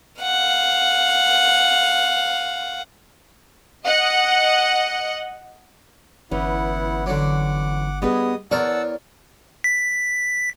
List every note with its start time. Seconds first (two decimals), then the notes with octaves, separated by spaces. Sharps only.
0.22 F5 F#5
3.87 D#5 F#5
6.31 G1 E3 B3 C#4 E4 F#5
7.06 D3 F#3 F#5 D6
8.02 G2 B3 G#4 B4 D#5 D#6
8.51 E2 A#4 C#5 D5 F#5 A5 E6
9.64 B6